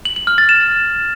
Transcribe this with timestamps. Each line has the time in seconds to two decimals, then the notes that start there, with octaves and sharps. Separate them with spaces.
0.05 F#7
0.16 F#7
0.27 F6
0.38 A6
0.49 E7